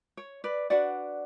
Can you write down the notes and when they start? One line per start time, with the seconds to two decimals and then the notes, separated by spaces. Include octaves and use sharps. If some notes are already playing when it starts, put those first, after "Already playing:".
0.17 C#5
0.44 B4 D5
0.70 D4 F#4 B4 D5 F#5